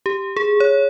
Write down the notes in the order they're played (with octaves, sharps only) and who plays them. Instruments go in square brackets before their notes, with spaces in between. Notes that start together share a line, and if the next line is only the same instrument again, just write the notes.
[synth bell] G4
G#4
C#5